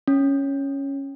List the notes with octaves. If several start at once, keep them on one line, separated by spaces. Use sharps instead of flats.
C#4